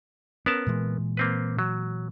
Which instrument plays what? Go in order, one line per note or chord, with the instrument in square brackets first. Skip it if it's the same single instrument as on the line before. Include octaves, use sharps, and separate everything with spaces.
[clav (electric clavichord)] B3 A#4 A5 [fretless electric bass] C#4
[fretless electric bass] A#2 E3 G#3
[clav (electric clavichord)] A#3 C4 B4
F#3